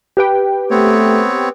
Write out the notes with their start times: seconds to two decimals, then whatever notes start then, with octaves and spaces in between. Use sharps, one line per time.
0.17 G4 B4 G5
0.71 A3 B3 C4 C#5